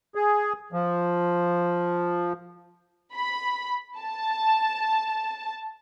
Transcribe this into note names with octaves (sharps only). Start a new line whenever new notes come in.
G#4
F3
B5
A5